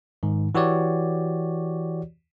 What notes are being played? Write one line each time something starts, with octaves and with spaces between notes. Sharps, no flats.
G#2 D#3
E3 F#4 G4 C#5 D5